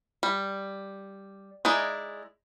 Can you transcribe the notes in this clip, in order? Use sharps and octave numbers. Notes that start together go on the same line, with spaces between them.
G3
G#3 D#4 E4 D5